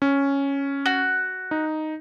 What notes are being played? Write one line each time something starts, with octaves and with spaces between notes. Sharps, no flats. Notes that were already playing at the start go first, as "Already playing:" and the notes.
C#4
F#4
D#4